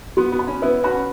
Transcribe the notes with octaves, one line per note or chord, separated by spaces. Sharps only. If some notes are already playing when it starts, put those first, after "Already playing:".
B3 F#4
B3
B5
C#4
B3 E4 B4
C#4 F#4 B5